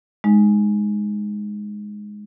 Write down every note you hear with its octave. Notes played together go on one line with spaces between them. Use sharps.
G#3 D#4